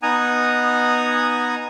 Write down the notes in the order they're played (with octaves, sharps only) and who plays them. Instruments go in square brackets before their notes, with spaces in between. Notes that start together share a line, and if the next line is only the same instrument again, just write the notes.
[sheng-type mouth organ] B3 D#4 F#5 G#5 A#5 D#6